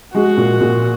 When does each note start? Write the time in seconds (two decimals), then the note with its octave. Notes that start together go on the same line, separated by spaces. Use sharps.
0.14 G#3 F#4
0.37 A#2
0.61 A#2